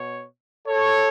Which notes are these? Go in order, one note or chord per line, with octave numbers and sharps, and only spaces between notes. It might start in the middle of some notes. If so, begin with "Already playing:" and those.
Already playing: B2 C#5
A4 C#5